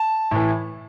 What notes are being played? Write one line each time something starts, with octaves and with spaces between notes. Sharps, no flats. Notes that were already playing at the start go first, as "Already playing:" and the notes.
Already playing: A5
A2 E3